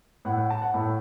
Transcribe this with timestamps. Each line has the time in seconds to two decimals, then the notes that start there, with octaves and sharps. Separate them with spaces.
0.25 A2 A3 F#5
0.37 F#5
0.50 A5
0.62 F#5
0.74 A2 A3